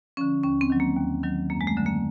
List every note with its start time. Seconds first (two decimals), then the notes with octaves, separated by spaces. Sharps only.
0.17 D3 F3 C#4
0.43 D#2 C#4
0.61 C4
0.70 D#3 F#3
0.80 A#3
0.96 D#2
1.23 D#3 F#3
1.50 F#2 A#3
1.61 G#3
1.67 A3
1.77 D3 F#3
1.86 A#3